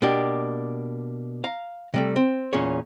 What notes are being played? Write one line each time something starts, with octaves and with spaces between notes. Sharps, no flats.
B2 A#3 D4 G4
F5 A#5
C3 G3 A3
C4
E2 A#2 C#4 G#4 C#5